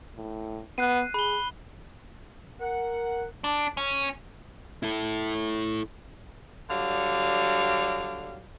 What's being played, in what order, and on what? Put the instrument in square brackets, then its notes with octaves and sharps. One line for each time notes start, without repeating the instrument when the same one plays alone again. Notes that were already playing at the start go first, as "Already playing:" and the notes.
[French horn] A2
[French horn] B3 [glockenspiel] F#6 C7 D#7
[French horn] G#4 [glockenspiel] B5 G7
[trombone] A#4 [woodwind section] F#5
[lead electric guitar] D4
C#4
E4 A4
[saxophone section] D3 F#3 G3 F5